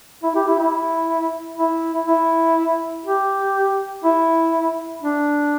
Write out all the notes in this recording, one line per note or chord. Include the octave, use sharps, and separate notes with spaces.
E4
G4
E4
E4
E4
E4
G4
E4
D4